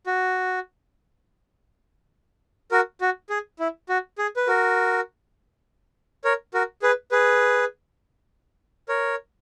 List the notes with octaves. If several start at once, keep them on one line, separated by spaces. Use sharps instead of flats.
F#4
F#4 A#4
F#4
G#4
E4
F#4
G#4
B4
F#4 A#4
A#4 C#5
F#4 A#4
G#4 B4
G#4 B4
A#4 C#5